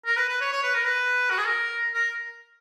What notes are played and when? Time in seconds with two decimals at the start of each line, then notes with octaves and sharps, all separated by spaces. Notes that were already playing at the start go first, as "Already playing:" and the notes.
0.06 A#4
0.17 B4
0.29 B4
0.41 C#5
0.52 C#5
0.63 B4
0.74 A#4
0.85 B4
1.30 F#4
1.38 G#4
1.46 A#4
1.94 A#4